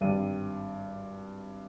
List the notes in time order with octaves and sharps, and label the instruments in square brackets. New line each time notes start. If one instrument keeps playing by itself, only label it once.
[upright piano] G#1 G2 G3 D5 D#7